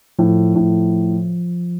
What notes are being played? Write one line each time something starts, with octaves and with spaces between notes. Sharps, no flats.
A2 F3
A2